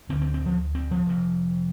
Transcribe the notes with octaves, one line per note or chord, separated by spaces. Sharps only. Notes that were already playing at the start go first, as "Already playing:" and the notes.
D2 D3 C4
C4
C4
F3
C4
F3
F1 F2 C3